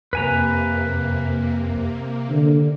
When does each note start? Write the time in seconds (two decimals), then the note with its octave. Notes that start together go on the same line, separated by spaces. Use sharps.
0.13 F2 C3 A#3 B4 G#5 A#5
2.30 D3